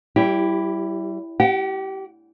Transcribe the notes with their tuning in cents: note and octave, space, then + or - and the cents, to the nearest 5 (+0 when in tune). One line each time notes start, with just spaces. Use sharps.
G3 -35 E4 +5 G4 +0
G4 -25 F#5 +30